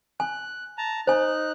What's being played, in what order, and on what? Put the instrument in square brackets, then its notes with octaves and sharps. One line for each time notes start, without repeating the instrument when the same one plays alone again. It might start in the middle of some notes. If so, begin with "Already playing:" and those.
[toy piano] G#5 [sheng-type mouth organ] F#6
[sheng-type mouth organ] A5 A#5
[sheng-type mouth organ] D#4 F#6 [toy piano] C5 G#5